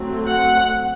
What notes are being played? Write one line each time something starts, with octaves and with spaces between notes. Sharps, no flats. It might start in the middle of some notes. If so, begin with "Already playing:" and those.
Already playing: F#3 A3 C4
F#5